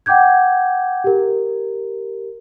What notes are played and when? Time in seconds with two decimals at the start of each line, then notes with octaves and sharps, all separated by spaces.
0.06 F#5 G5 D6 G6 G#6
1.04 G4 A#4